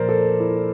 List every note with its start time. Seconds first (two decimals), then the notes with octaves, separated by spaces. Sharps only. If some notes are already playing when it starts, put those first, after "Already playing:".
Already playing: A#2 F3 A#3 A#4 C5 D5
0.09 A4
0.40 E4